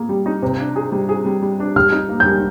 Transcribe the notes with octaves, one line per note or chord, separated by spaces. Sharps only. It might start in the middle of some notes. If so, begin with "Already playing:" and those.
Already playing: A#3 G#4
G3
D#4
C3
D4
G#4
G3
G#4
G3
G3
D4
G3 F6
D#4
A#3
G6
G3